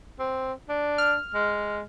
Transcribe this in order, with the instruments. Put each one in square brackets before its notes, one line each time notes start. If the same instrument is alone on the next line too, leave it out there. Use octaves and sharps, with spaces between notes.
[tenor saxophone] C4
D4
[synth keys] F6
[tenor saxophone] G#3